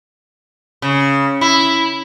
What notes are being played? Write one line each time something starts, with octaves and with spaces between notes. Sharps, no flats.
C#3
E4